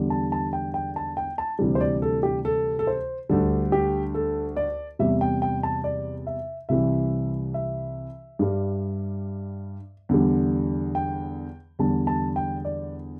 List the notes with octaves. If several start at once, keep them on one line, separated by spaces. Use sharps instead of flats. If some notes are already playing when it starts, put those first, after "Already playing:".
Already playing: E2 D3 G3
A5
A5
G5
G5
A5
G5
A5
D2 C3 E3 G3
C5
D5
A4
G4
A4
A4
C5
D2 D3 G3 A4
G4
A4
D5
E2 C3 G3 E5
G5
G5
A5
D5
E5
C2 C3 E3 G3 E5
E5
G2 G3
E2 D3 G3
G5
E2 D3 G3 A5
A5
G5
D5